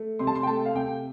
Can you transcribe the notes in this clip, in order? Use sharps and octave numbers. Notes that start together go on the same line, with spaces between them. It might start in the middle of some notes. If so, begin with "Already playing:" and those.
Already playing: A3
C3 C6
A5
C6
G5
A3 A5
F5
C3 G5